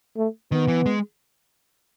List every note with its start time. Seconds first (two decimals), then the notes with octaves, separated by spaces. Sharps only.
0.17 A3
0.52 D#3 B3
0.68 E3
0.86 G#3